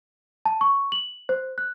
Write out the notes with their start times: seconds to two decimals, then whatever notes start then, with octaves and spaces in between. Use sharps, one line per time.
0.45 A5
0.61 C#6
0.92 F#7
1.29 C5
1.58 F#6